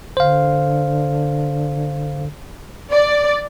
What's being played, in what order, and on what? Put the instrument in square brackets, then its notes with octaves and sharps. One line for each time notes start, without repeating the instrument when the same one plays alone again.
[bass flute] D3 [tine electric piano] C5 F5
[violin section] D5